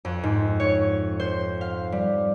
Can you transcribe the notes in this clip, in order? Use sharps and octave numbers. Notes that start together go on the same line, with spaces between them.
F2
G#2
C#5
C5
F5
G3